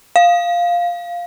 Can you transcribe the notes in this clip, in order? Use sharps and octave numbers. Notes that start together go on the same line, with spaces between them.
F5